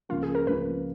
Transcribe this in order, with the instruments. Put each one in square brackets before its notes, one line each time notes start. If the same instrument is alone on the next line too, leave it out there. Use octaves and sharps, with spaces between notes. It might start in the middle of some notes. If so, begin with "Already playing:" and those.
[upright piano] C#2 C#3 F3 A#3 [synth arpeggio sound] F4
[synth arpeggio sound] G#4
A#4
[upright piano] C#2 C#3 F3 A#3 [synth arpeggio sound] B4